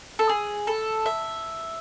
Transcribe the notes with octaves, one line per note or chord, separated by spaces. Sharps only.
A4
G#4
A4
E5